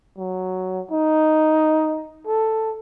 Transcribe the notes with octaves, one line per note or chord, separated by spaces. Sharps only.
F#3
D#4
A4